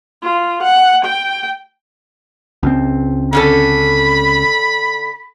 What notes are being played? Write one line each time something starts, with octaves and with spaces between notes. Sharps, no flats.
F4
F#5
G5
C#2 C4
D3 C#4 A4 B5